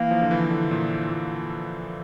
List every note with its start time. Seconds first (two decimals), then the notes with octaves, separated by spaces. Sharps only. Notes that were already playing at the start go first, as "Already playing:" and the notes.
Already playing: E3 A#3
0.11 F3
0.22 D3
0.31 E3
0.50 D3
0.71 A#2
1.11 A#2